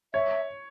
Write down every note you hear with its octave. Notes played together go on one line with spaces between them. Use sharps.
C#5 E5